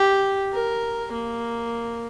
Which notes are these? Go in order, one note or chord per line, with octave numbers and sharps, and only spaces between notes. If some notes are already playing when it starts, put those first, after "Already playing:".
Already playing: G4
A#4
A#3